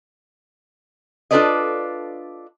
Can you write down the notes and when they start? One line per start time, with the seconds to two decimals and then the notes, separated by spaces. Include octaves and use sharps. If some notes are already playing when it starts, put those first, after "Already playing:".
1.31 D4 F4 A4 B4 D5 D#5